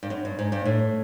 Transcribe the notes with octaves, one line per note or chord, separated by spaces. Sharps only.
G2
F#2
G2
G#2
G2
A2